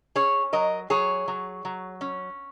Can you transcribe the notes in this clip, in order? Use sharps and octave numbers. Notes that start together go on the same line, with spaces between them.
C#4 G#4 C#5
F#3 A#4 D#5
F#3 G#4 C#5
F#3
F#3
C#4